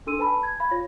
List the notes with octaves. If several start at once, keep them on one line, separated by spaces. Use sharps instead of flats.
D4 D#4 A4 C6 E6 D#7
B4 G#5 A5 B5
G#6
F5 B5 G#6
F4 C#5 A#6